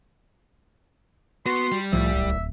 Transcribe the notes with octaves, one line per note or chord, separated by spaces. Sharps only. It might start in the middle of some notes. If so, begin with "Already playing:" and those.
B3 F#4 C6
G3
C2 A2 F3 E5
D1